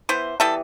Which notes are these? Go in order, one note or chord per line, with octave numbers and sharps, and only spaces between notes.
E3 B3 C5
E3 G3 B3 A4